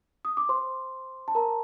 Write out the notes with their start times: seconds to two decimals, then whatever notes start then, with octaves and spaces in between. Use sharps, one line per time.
0.25 D#6
0.37 D6
0.49 C5 C6
1.28 A5
1.35 A#4 A#5